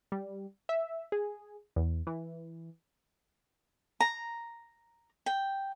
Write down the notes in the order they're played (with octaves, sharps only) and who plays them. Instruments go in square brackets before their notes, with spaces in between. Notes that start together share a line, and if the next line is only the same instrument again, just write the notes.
[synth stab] G3
E5
G#4
E2
E3
[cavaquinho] A#5
G5